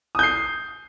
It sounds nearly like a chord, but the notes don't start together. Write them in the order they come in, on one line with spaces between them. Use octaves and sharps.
D#6 G6 C7